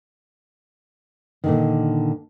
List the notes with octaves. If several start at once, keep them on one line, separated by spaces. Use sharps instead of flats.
A#2 D3 D#3